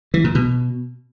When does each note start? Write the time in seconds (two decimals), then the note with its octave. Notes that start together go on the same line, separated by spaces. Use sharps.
0.14 E3
0.24 A#2
0.35 B2